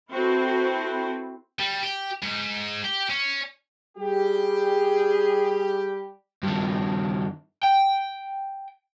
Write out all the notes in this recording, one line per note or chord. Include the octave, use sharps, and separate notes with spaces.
C4 E4 F#4 A4 B4 C5
G3
G4
G#2
G4
C#4
G3 G4 G#4
G2 D#3
G5